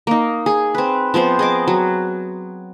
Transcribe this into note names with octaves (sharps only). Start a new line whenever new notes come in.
A#3 D#4
G#4
C4 B4
F3 B3 C4 C5
G#4 D#5 D6
F#3